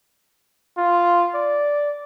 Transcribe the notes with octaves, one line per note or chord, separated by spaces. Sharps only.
F4
D5